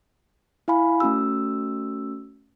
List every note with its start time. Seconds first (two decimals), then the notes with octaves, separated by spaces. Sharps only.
0.68 E4 F5 G#5 B5
1.00 A3 C#4 F#4 E6